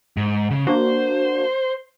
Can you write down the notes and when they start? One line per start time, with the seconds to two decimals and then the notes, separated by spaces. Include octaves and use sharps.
0.17 G#2
0.50 C#3
0.67 A#3 D4 F#4 C5